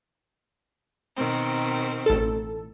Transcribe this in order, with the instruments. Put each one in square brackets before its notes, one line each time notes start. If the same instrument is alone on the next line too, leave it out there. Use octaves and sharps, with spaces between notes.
[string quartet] B2 D#3 C4
[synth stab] A1 A4